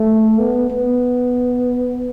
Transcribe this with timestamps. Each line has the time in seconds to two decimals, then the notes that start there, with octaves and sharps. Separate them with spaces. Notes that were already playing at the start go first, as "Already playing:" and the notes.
Already playing: A3
0.39 B3
0.70 B3